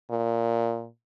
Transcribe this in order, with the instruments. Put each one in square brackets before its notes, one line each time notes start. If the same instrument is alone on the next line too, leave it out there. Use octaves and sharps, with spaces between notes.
[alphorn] A#2